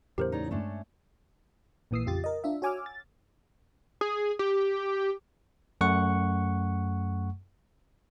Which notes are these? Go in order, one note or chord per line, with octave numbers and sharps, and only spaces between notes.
E2 A2 C#3 G4 A#4 C5
D#4 C#5 D5
G2 G#3 A3 C#4 D4
A#1 A#2 E3 D#6 E6 C7
F2 C#3 F4 G4 A6
A#4 D#5
D4 F4 E5
F#4 C#5 G#5 D6 E6 F6
A6
G#4
G4
F#2 A3 F#5 C#6